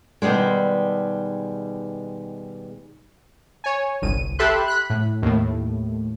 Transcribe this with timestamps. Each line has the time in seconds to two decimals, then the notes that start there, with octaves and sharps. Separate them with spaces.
0.22 B2 D#3 G3 G#3
3.64 C#5 G#5
4.02 G1 C2 D#7
4.39 G4 A4 E5 B5 C6 F#6
4.68 B5 F#6
4.90 A2
5.22 D#2 A2